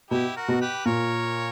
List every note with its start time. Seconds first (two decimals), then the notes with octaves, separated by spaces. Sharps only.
0.11 B2 E4 G4
0.36 F#4 A#4
0.48 B2
0.61 G4 B4
0.85 A#2 A#4 C#5